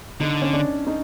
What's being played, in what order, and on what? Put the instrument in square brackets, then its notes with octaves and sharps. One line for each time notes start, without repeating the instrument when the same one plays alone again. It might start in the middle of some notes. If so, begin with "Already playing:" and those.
[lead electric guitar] D3 [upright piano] D#4
[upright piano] C#4
D4
D#4